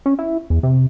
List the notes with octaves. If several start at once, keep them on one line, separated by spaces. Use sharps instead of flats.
C#4
E4
E2
C3